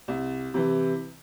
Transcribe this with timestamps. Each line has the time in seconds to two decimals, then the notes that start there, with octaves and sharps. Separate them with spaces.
0.08 C2
0.54 C3 E3